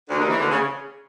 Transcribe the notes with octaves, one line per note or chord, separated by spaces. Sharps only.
D2 D3
D#2 D#3
E2 E3
D2 D3
C#3